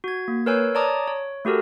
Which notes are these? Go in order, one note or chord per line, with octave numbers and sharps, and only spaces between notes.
F#4 G#6
A#3
A#4 B4 C#5 G#5 E6 G6
C#5 D5 A5 A#5 D6 D#6
C#5
A3 F#4 G4 A4 A#4